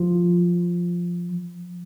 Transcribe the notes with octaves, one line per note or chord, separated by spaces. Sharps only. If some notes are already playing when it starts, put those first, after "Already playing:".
Already playing: F3